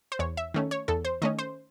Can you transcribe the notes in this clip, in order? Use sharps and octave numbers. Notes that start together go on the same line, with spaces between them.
C5
E2 C#5
E5
D#3 A3 C#4
C#5
E2 A4
C5
D#3 A3 C#4 D#5
C5